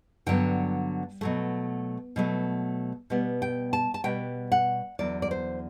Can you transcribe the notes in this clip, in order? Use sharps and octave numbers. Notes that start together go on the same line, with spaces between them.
G2 D3 F#3 B3 G5
B2 F#3 A3
B2 F#3 A3
B2 G3 B3
G5
A5
A5
B2 G3 B3 G5
F#5
E2 D3 F#3 D5
D5
C5